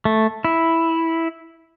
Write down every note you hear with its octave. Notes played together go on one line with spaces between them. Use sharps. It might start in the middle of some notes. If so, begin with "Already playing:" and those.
A3
E4